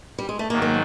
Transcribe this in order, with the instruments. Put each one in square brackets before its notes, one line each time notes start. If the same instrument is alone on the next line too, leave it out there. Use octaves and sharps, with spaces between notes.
[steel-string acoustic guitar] G3
G#3
A3
[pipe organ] G#2 D#3 F#3 [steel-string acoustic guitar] A#3
[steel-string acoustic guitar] A#3